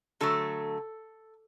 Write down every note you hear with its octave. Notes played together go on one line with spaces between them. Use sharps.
D3 F#3 A3 A4